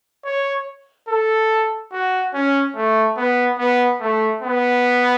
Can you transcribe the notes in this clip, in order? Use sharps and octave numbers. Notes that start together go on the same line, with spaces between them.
C#5
A4
F#4
C#4
A3
B3
B3
A3
B3